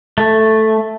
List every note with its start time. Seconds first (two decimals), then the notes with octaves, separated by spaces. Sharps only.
0.18 A3